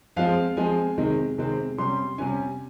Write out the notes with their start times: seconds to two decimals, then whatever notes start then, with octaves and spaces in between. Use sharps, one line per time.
0.16 F3 G#3 C4 F5
0.57 F3 G#3 C4 G#5
0.98 C3 D#3 G#3 C4
1.38 C3 D#3 G#3 C4
1.78 C3 G3 C#4 C6
2.18 C3 G3 C#4 G#5